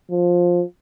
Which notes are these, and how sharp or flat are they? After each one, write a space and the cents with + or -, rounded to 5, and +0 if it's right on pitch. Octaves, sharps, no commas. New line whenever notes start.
F3 +10